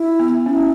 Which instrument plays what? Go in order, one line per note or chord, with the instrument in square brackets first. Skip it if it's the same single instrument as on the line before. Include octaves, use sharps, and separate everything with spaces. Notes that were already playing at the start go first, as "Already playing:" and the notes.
Already playing: [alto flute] E4
[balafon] B3
[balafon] C#4 [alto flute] E4